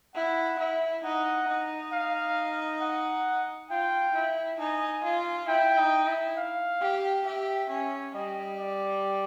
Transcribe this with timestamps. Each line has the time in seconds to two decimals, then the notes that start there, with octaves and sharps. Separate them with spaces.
0.15 E4 F#5
0.59 E4
1.03 D#4 F#5
1.48 D#4
1.92 F5
2.81 F#5
3.70 F4 G5
4.15 E4
4.59 D#4 G#5
5.04 F4
5.48 E4 G5
5.78 D#4
6.07 E4
6.37 F5
6.81 G4
7.25 G4 E5
7.70 C#4
8.14 G3 D#5
8.59 D5